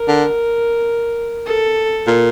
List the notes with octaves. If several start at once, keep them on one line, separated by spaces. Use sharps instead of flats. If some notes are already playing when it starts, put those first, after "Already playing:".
Already playing: A#4
D3
A4
A#2